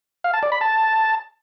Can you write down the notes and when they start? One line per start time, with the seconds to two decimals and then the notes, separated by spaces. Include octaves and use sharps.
0.24 F5
0.34 A5
0.43 D5
0.52 B5
0.61 A5